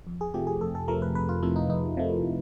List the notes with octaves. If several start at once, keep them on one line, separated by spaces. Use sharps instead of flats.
F2
G#4
C3 F3 A3 G4
G#4
F2 A4
A4
C3 F3 A3 A#4
B4
F2 B4
F4
C3 F3 A3 E4
D#4
F2 D#4
C3 F3 A3